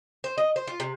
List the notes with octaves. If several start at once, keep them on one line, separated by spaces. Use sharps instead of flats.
C5
D#5
C5
F4
C3